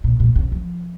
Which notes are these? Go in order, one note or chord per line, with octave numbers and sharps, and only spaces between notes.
A#2
A#2
C3
F3